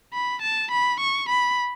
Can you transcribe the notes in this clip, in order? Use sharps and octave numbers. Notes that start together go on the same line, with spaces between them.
B5
A5
B5
C#6
B5